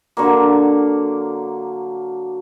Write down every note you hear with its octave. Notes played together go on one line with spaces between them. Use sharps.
D3 F#3 A#3